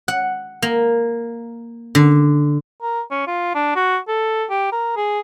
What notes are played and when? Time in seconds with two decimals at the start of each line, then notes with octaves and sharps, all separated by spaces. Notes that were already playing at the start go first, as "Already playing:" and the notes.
0.08 F#5
0.62 A#3
1.95 D3
2.82 A#4
3.11 C#4
3.27 F4
3.55 D4
3.76 F#4
4.08 A4
4.50 G4
4.72 A#4
4.97 G#4